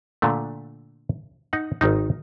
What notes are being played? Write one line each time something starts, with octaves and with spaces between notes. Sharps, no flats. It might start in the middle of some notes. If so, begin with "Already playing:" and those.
A#2 D3 A3
D#4 F#5
G#1 D#3 D#4